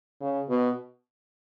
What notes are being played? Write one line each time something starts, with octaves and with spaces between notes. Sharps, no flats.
C#3
B2